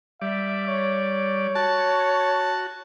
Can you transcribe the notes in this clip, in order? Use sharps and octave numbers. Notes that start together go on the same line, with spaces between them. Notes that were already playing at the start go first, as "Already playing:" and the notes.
G3 D5 E5
C#5
F#4 A5